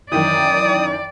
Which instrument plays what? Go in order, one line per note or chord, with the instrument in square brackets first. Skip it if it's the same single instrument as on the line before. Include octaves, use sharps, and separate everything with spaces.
[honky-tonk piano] F#2 D#3 E3 [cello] D5 [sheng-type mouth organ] D#6